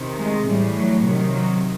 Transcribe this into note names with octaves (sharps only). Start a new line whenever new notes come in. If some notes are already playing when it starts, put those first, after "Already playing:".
Already playing: C3 D#3
G#3
A2 E3 G3
F#3
C3 D#3 F#3
F#3